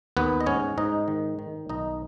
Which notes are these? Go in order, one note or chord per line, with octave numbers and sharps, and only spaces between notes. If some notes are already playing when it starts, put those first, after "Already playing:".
D#2 B3 B4
D#5
G#2 C#4 C#5
G#2 D#4 D#5
D#3
D#3
B1 D#4 D#5